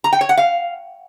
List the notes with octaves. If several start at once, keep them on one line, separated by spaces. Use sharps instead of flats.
A#5
G5
C#5
F#5
F5